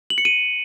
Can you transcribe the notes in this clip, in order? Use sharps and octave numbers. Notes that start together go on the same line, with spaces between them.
F#7
C#7
D#7